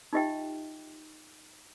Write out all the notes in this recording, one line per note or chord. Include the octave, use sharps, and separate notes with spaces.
D#4 F4 G4 D#5 E5 G5